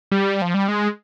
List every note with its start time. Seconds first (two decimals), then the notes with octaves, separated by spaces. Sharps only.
0.12 G3
0.42 F3
0.54 G3
0.68 G#3